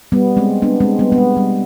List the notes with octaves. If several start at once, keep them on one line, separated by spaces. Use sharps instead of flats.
G3 B3
G#3 C4
B3 D4
G#3 C4
G3 B3
B3
G#3
G3